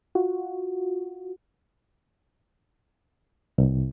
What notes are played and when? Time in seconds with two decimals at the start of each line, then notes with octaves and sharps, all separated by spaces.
0.15 F4 F#4
3.58 C2